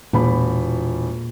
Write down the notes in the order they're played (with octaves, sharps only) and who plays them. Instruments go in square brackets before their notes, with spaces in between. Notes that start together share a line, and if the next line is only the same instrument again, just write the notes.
[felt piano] E1 B5 [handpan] A#2